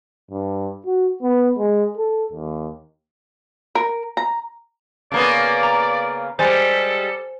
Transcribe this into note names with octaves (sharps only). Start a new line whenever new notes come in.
G2
F#4
B3
G#3
A4
D#2
A#4
A#5
C#3 A#3 B3 D5
A#5
G3 G#3 A4 C5 G#5 A6